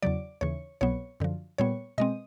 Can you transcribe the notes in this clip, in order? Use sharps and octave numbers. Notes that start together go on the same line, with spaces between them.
E2 C#3 F#3 D5
D#2 C#3 E3 C#5
C2 B2 F#3 B3 C#5
F#2 D3 F3
A#2 G3 B3 C#5
B2 G#3 C4 D#5